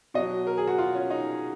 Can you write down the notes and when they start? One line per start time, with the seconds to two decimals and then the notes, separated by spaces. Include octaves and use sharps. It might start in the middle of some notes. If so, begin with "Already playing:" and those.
0.14 B2 F#3 D#5
0.47 A#4
0.57 G#4
0.67 F#4
0.78 F4
0.95 C#4
1.10 D#4